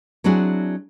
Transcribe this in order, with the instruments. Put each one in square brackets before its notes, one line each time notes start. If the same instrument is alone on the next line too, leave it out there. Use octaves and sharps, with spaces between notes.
[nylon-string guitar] F#3 C4 D4 E4 F#4 G#4